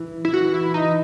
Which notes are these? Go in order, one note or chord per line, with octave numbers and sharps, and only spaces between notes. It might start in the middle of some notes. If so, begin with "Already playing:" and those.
Already playing: E3
E4
E3 F#4
E4
D#4